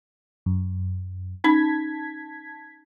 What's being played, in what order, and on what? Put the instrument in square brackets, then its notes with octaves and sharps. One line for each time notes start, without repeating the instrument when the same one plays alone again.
[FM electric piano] F#2
[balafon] C#4 D#4 B5 [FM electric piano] A5 G#6 B6